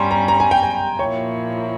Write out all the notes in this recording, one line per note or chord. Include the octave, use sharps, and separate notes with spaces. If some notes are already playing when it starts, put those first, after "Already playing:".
Already playing: G2 G3 C#4 A#5 C6
A#5
A#5
G#5
G5
G#5
A#2 F3 A#3 E4 C#5